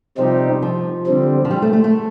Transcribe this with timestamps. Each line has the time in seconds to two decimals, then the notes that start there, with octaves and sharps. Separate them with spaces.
0.18 C3 F3 G3 C4 D#4 G4
0.62 F3
1.07 D3 G3 C4
1.45 F3
1.51 G3
1.62 A3
1.73 A3
1.84 A3